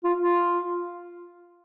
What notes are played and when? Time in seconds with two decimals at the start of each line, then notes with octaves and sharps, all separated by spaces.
0.04 F4
0.20 F4